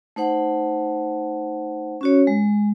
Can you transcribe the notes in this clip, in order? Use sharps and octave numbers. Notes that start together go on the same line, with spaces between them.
A3 D#4 C5 F#5
C#4 F#4 C#5
G#3